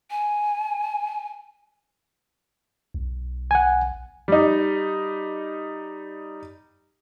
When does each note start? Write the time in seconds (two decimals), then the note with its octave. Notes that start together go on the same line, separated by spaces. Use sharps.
0.10 G#5
2.94 B1
3.51 F#5 G#5
4.28 G3 D#4